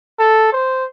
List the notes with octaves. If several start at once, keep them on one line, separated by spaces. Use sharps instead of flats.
A4
C5